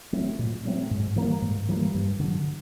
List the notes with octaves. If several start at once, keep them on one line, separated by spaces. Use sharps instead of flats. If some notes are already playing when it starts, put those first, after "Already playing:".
F#3 A3 C4
A#2
F#3 A3 C4
G#2
E3 G3 A#3
G#2
E3 G3 A#3
G2
D3
F#3